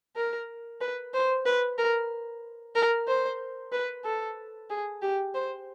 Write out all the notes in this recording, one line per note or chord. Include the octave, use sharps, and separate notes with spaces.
A#4
B4
C5
B4
A#4
A#4
C5
B4
A4
G#4
G4
C5